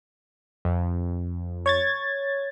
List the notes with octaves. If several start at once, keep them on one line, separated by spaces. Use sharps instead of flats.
F2
C#5 G#6 A6